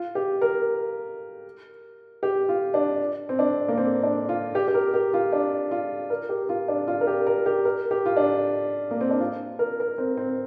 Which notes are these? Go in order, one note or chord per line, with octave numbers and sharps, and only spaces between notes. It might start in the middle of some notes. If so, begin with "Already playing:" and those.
Already playing: F4
G4
A#4
G4
F4
D4
C4
D4
A#3
C4
D4
F4
G4
G4
A#4
G4
F4
D4
F4
A#4
G4
F4
D4
F4
A#4
G4
A#4
G4
A#4
G4
F4
D4
A#3
C4
D4
F4
A#4
A#4
C4
C4